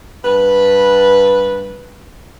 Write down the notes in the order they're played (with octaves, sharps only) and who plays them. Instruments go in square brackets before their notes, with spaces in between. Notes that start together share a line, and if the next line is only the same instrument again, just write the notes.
[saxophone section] G2 B4